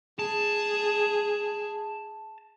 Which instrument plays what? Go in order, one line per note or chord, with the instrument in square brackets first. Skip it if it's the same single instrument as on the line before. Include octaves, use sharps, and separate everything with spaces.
[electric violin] G#4 [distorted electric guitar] A5